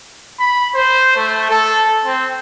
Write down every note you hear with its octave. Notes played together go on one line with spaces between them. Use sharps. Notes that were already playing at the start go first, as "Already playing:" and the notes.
B5
C5
A3
A4
C4